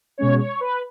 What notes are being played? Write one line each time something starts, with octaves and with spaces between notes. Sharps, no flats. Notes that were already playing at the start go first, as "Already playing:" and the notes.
B2 G#3 C#4 C#5
C#5
B4